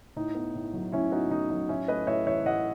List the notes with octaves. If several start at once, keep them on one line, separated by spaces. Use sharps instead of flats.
A2 D#4
B3
A2
F#3
A2 C#4 E4
B3 D#4 F#4
A2 D#4
F#3 D#4
A2 C#4 E4
A3 B4 D#5
A2 C#5 E5
E3 C#5 E5
A2 D#5 F#5